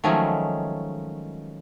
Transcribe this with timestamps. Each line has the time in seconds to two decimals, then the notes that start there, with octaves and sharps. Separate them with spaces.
0.04 D#3 F3 F#3 G#3 A3 C#4